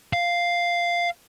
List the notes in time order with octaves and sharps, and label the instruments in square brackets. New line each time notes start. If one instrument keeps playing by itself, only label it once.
[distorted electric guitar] F5